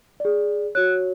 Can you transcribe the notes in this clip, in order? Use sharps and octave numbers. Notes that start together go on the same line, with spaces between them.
G#4 D5
F#4 C#5 F#6